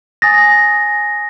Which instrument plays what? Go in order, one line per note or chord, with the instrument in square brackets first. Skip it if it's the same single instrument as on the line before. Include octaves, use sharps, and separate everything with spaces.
[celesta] G#5 D#6 A6 [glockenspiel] A#6